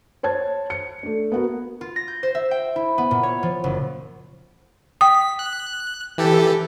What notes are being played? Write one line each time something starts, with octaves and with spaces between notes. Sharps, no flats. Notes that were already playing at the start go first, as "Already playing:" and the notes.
C5 C#5 A5 G#6
C#7
A3 D4
B3 F#4 A#4
F4
A#6
G6
C5
E5
G5
E4
B3
A#2
C#5
F3
F#1
G5 D#6 B6
F#6
E3 G4 A4